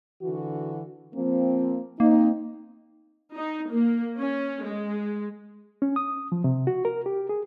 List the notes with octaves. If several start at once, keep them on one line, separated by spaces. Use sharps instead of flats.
D3 E3 F#4
F3 A#3 C4
A#3 C4 D#4
D#4
A#3
C#4
G#3
C#4
D#6
F3
C3
F#4
A#4
G4
G#4